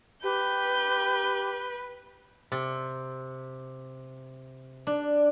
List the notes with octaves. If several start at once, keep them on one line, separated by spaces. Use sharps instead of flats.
G4 B4 G6
C3
D4